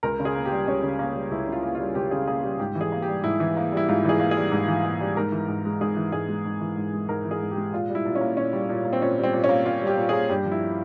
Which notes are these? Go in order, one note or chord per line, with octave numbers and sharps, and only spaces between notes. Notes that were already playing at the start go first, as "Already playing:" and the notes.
C#2 A#4
C#3
G#4
A#3
G4
G3
C#2 C#4
C#3
A#3
G3
C#2 E4
C#3 F4
A#3
G3 F4
C#2 G4
C#3 G#4
A#3 G#4
G3 G4
G#2 G4
E3
G#4
A#3
G4
G3
G#2 E4
E3
A#3
G3 E4
G#2 F4
E3 G#4
A#3
G#4
G3
G#2
E3
A#3
G3
G#2 A#4
E3
G#2
G#3
G#2 G#4
E3
G#2 G#4
G#3
G#2
E3
G#2
G#3
G#2 A#4
E3
G#4
G#2
G4
G#3
A#2 F4
G3
E4
A#2
C#4
A#3
A#2 C#4
G3
A#2
A#3
C4
A#2 C#4
G3
C4
A#2
C#4
A#3
A#2 F4
G3
G4
A#2
A#3 G#4
G2 G4
F3
E4